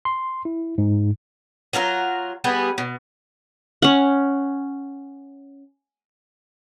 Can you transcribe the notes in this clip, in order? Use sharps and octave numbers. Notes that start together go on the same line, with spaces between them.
C6
E4
G#2
F#3 F4 A4 A#4
G3 B3 G#4
B2
C#4 F#5